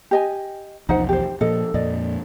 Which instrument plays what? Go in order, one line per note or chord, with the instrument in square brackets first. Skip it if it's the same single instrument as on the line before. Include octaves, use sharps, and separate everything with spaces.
[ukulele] G4 D#5 G#5
[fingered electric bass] B1 E2 F3 [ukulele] D#4 C5 F#5
[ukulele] G4 C5
[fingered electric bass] A#2 F3 [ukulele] A4 D#5
[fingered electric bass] F2 A#2 [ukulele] D5 D#5